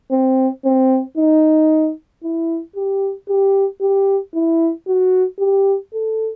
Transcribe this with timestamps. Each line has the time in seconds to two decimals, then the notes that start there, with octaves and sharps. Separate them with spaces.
0.11 C4
0.65 C4
1.17 D#4
2.23 E4
2.76 G4
3.29 G4
3.81 G4
4.34 E4
4.87 F#4
5.39 G4
5.93 A4